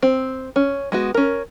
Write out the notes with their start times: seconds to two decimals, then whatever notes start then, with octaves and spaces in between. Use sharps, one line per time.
0.03 C4
0.56 C#4
0.92 G#3 B3 F#4
1.14 C#4 A#4